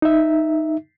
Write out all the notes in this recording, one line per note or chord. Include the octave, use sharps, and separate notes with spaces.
D#4 E5